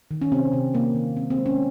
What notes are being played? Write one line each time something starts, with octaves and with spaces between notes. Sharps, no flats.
D#3
C#4
C3 C4
C3
C3 A#3
D#3
G#3 C4
C4
G#3
C#4